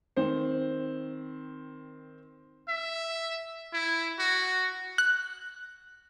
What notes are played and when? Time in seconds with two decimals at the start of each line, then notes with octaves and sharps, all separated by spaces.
0.16 D#3 C4 C5
2.69 E5
3.74 E4
4.19 F#4
4.98 F#6